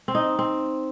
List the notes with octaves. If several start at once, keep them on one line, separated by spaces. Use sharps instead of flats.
C4
D#4
C4